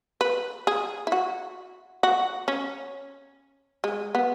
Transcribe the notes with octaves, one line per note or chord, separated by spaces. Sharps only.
B4
G#4
E4
F#4
F#4
C#4
G#3
B3